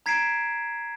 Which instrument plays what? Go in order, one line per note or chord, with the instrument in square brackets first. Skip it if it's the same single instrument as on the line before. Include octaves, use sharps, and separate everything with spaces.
[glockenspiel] A#5 G#6 B6 C7 D7 E7